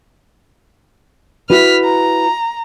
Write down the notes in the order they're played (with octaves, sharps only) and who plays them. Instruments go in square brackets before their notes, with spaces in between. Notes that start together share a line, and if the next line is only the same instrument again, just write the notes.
[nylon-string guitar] E4 F#4 B4 [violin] F6 B6
[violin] A#5